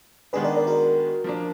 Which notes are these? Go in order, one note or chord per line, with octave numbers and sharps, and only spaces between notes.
D#3 G#3 B3 D4 G#4 B4
A#4 D5
A#4 D5
F#4 A#4
F3 A#3 D4